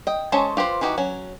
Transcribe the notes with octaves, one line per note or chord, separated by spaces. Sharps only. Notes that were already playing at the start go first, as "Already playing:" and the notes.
D#5 G5
G#3 C#4 A4 C5 C#5
F4 G4 B4 C5
E3 D#4 F#4 G4
F#3 C#4